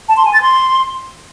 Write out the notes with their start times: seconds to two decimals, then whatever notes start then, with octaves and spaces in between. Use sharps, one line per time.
0.09 A5
0.17 C6
0.25 G#5
0.33 A6
0.42 C6